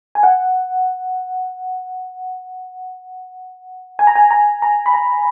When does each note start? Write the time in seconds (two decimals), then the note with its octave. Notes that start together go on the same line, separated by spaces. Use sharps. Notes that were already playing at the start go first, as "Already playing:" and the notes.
0.15 G#5
0.23 F#5
3.99 G#5
4.07 A#5
4.15 G#5
4.31 A#5
4.62 A#5
4.86 B5
4.93 A#5